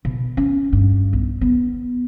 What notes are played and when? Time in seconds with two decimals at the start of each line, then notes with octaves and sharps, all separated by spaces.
0.05 B2
0.37 C#4
0.73 G2
1.13 B1
1.41 B3